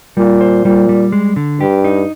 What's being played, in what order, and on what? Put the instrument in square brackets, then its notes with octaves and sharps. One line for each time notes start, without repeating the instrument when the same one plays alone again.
[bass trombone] A#2 [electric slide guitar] G3
[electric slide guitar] C5
[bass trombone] A#2 [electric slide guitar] G3
[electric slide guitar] G3
G#3
D3
[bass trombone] G2 [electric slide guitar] G4
[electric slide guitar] D#4